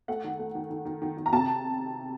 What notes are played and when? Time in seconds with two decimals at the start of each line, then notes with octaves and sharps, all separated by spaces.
0.08 A3 F#5
0.24 D#3
0.39 A3
0.55 D#3
0.70 D#3
0.85 D#3
1.02 D#3
1.17 D#3
1.26 A#5
1.32 C3 A5